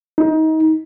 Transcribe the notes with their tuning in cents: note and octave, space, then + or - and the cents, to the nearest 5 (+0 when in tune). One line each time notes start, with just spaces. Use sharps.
D#4 +25